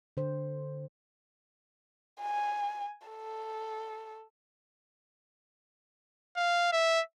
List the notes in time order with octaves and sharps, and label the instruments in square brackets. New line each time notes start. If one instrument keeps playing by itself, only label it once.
[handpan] D3 C5
[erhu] G#5
A4
[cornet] F5
E5